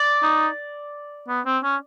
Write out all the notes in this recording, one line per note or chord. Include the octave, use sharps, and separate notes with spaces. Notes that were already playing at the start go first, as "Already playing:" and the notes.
Already playing: D5
D#4
B3
C4
C#4